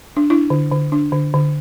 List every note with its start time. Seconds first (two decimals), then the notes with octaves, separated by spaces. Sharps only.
0.17 D4
0.30 D4 E4
0.50 D3
0.72 D3
0.92 D4
1.12 D3
1.34 D3